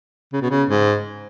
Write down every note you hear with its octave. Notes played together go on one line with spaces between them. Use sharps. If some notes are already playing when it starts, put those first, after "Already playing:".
C#3
B2
C#3
G#2